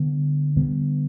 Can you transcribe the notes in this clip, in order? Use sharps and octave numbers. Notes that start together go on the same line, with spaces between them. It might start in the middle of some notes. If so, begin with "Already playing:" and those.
Already playing: D3 G3 B3
D3 G3 B3